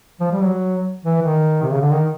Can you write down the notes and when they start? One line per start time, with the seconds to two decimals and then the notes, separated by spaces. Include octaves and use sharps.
0.20 F3
0.32 G3
0.43 F#3
1.05 E3
1.23 D#3
1.62 C3
1.72 C#3
1.81 D3
1.92 D#3